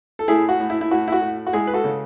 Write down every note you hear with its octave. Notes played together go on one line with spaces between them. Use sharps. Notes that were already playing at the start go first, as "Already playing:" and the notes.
A4
A2 E4 G#4
F#4
A2
E4
E4
A2 F#4
E4
F#4
A2
F#4
G#3 E4 G#4
B4
F#4 A4
C#3